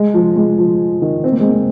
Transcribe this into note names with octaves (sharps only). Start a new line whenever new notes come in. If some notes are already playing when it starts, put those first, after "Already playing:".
Already playing: G#3
F3
G#3
F3
D#3
C4
A#3
G#3
A#3